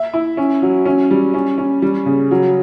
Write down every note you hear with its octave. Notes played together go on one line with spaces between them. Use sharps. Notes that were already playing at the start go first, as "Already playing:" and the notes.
Already playing: E5
E4
C#4
F#3
C#4
G3
C#4
C#4
G3
C#3
F#3